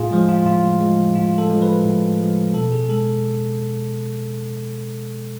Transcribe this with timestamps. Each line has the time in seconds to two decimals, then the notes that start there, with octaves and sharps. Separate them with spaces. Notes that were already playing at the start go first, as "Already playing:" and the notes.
Already playing: A2 F4 G#4
0.11 F3 G#3
0.29 F4
0.45 A2 F4
0.80 F3 G#3
1.15 A2 F4
1.38 A4
1.50 F3 G#3
1.62 B4
1.85 A2
2.19 F3 G#3
2.54 B2 A4
2.72 G#4
2.88 G#3 A4